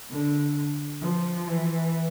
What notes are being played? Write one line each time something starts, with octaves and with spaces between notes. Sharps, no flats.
D3
F3
E3